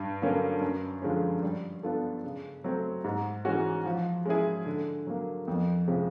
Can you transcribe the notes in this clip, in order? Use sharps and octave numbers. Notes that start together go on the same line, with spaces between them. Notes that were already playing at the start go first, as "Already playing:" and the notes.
Already playing: G2
D3 F#3 A#3 C#4
F#2
D3 F3 G#3 C#4
G3
B3 D4 F4 A4
C#3
F#3 A3 C4
G#2
E3 G#3 C#4 F#4
F3
G#3 C#4 E4 G#4
D3
F#3 A#3
F2
C3 F3 G#3 C#4